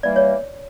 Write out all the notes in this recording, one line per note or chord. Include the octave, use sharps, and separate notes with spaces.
E3 G3 A#3 D5
C#5